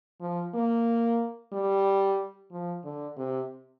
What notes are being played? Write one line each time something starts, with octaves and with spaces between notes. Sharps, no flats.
F3
A#3
G3
F3
D3
C3